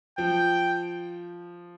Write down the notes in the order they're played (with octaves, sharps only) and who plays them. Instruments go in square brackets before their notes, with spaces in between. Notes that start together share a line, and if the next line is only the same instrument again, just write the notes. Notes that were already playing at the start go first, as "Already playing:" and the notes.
[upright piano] F3 [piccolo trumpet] G5